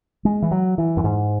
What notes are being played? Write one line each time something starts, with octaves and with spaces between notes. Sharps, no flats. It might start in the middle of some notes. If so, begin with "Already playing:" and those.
G#3
E3
F#3
E3
F#2
G#2